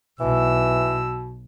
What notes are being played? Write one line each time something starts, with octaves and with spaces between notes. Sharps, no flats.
B1 B2 E3 E6